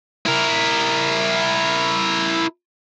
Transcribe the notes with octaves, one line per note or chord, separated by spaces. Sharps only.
E4 A#4